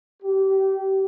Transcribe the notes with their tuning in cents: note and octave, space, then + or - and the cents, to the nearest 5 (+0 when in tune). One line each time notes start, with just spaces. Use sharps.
G4 -25